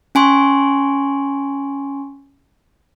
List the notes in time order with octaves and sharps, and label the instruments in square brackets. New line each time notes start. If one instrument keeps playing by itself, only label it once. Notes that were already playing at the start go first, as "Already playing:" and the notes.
[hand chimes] C#4 G#5 C6 C#6